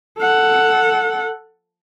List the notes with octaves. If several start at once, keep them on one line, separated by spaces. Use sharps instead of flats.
A4 F#5